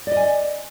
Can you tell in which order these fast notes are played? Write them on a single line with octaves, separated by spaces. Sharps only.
D5 D#5 G#5